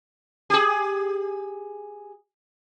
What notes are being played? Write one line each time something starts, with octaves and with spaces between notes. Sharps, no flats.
G4 G#4